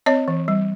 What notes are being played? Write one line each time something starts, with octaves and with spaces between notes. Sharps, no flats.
C4 C#5 D#5
E3
G3